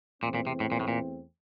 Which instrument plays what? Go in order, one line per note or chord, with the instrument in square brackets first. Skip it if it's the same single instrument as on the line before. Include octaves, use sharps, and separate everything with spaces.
[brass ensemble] E2 E3 A3 C4 [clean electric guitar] A#2
[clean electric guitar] A#2
C3
A2
A#2
A2
A#2